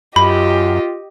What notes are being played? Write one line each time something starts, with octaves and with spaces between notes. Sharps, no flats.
F#2 F4 G4 D#5 B5